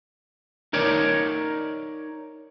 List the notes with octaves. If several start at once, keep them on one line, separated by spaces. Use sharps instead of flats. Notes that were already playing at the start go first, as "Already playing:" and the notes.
D#4 A#4 C#5 D5